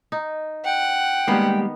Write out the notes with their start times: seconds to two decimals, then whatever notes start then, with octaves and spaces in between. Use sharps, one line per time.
0.12 D#4
0.65 F#5 G5
1.28 D#3 G3 G#3 A#3 B3 D#5